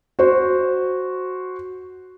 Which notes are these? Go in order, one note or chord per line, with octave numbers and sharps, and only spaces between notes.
F#4 C5